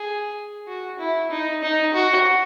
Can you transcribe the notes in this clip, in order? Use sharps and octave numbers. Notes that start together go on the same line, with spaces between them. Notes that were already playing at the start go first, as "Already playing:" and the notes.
Already playing: G#4
F#4
E4
D#4
D#4
F#4